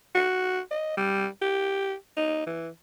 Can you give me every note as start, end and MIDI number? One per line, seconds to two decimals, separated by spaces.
0.15 0.60 66
0.71 0.97 75
0.97 1.27 55
1.41 1.94 67
2.17 2.43 63
2.47 2.69 52